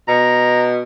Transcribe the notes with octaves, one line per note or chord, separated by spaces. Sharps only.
B2 A#5